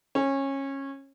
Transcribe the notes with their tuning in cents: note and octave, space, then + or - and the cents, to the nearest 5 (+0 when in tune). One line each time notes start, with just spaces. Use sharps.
C#4 -20